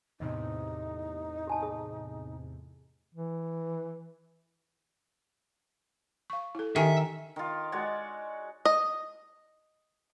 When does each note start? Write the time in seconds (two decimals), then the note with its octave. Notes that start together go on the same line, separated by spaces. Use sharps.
0.20 E2 A2 C3 D#4 D#5
1.47 G4 G#5 A5
1.62 G#4 D#6
3.14 E3
6.30 F5 C#6
6.55 E4 A4
6.76 D#3 G4 E5 G#5
7.36 D#3 F4
7.72 G#3 F#4 C#5 D5
8.65 D#5